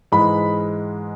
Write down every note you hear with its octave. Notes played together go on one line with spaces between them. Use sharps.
G#2 E3 G#3 B5